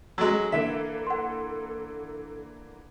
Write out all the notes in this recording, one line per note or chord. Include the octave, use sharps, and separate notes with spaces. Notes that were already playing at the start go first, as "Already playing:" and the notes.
F#3 G#3 A4 E6
D3 E3 A#3 E5
F#5 C6